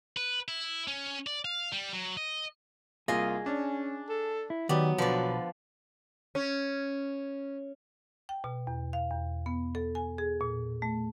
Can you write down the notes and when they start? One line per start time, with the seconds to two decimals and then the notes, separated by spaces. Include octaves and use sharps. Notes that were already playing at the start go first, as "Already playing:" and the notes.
0.17 B4
0.48 E4
0.88 C#4
1.27 D5
1.45 F5
1.72 G3
1.93 F#3
2.17 D#5
3.08 C2 A#3 F4 G#4 D#5 G#5
3.46 C#4 D4
4.09 A4
4.50 E4
4.69 D#3 F#3 B3 G4 B4 D5
4.98 B1 D3 F3 B4 D5
6.35 C#4
8.29 G5
8.44 B2
8.67 E2
8.93 F5
9.11 E2
9.46 B3
9.75 A4
9.95 G#5
10.18 G#4
10.41 A#2
10.82 A3